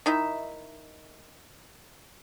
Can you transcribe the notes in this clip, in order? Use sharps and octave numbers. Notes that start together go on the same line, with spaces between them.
D#3 D#4 E4 E5